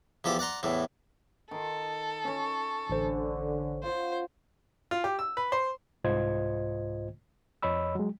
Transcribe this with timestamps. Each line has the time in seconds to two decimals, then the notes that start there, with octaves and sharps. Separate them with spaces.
0.24 E2 F3 G4 A4 D6
0.39 D5 F#5 A#5 C6
0.63 E2 A2 E3
1.51 D#3 A4 C6
2.24 C#4 C#5
2.90 A1 D3 C5
3.83 F4 C5 F#5
4.91 F4
5.04 G4
5.19 E6
5.37 B4
5.52 C5
6.04 C2 G#2 F4 C5 D#5 G#6
7.62 F2 C#5 D#5 B5 E6
7.95 F#3 G#3